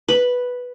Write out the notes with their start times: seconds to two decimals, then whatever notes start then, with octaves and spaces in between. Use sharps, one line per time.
0.08 B4